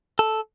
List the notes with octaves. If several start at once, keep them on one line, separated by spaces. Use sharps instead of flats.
A4